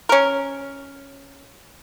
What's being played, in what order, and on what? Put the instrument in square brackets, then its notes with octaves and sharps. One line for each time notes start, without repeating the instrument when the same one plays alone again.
[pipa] C#4 A#4